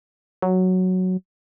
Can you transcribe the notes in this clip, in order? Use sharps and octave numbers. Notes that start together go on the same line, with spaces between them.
F#3